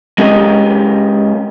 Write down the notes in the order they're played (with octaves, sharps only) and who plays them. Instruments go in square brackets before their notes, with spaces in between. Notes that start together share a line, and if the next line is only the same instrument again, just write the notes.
[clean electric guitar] G#3 C#4 G4 A#4 D#5